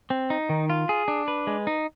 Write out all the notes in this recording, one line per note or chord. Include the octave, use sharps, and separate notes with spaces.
C4
D#4
D#3
F4
G#4
D4
B4
G#3
D#4